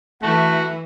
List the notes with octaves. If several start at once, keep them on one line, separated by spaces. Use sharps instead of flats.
E3 A3 F#4